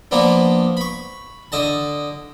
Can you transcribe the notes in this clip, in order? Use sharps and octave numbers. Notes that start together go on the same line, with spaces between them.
F3 A#3 B3 D4
B5 C#6
D3 D#5 A5